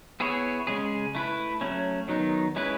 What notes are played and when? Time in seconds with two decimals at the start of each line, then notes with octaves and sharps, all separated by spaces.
0.20 B3 E4 G#4 C#5
0.67 C#3 G#3 C#4 G#4
1.15 A3 E4 B4
1.61 F#3 A3 C#4
2.08 D#3 F#3 B3 D#4
2.56 G#3 C#4 E4 B4